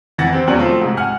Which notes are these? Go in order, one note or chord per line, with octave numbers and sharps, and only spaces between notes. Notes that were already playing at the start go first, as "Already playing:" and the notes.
F2 E3 F#5 A6 A#6
C4 G4
E2 D#3 F#3 C#4 D5 F#7
F3 A3 C4 F4
G#2 C3
F#5 G#5 F6